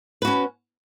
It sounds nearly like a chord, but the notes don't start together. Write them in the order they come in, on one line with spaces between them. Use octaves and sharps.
B4 F#4 C#4